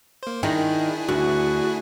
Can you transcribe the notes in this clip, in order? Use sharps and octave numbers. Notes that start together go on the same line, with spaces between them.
A#3 C5
D#3 D4 E4 G#4
D2 F#4